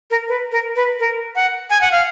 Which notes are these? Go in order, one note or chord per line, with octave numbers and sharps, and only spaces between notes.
A#4
B4
A#4
B4
A#4
F#5
G#5
F#5
F5